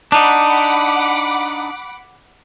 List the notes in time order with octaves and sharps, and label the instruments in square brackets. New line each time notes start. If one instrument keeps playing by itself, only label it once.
[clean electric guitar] D4 D#4 [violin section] F#5 B5 D6